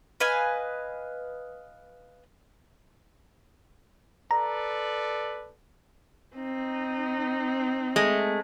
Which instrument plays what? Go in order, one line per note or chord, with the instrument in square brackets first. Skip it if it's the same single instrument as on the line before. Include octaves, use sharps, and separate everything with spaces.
[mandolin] B4 D#5 F5 G#5
[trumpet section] A4 B4 D5 [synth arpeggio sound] A#5
[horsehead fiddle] C4 D#4
[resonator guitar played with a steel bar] G#3 A3